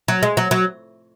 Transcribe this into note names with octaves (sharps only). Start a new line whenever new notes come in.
F#3
G#3
F#3
F#3